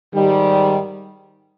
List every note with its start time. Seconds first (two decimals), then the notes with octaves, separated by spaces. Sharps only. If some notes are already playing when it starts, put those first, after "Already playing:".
0.14 G#2 D#3 G3